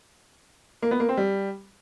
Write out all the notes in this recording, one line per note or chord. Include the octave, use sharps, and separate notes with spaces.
A#3
B3
A#3
C4
G3